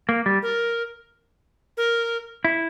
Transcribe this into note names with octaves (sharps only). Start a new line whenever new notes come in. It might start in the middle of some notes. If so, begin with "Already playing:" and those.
A#3
G3
A#4
A#4
E4